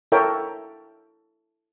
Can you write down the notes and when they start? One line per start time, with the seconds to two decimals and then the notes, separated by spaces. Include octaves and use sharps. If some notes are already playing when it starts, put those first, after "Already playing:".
0.12 E4 A4 A#4 C#5 E5 G5